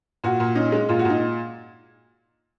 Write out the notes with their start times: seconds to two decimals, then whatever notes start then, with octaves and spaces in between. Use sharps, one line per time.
0.24 A#2 F#4
0.40 A#2
0.55 C#4 D#4
0.72 G#3
0.89 A#2 F4
0.99 F#4
1.05 A#2 D#4